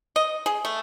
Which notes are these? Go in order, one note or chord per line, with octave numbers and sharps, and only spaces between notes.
D#5
G#4
A3